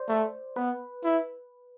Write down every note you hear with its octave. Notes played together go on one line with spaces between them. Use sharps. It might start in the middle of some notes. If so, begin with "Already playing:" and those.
Already playing: C5 D5
A3
B3 B4
E4